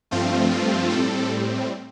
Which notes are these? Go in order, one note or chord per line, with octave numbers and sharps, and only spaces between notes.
G2 F3 A3 C4 F4
F4
A2 G3 C4 A4